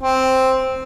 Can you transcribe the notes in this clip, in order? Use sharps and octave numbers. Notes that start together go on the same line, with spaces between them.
C4